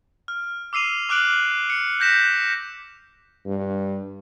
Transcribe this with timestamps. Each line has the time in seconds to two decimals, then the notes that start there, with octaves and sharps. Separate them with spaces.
0.28 F6
0.73 D6 E6 C7 D#7 F7
1.09 D6 F6 F#6 D7 F#7
1.70 C#7
2.00 F#6 G6 A#6 B6 E7
3.46 G2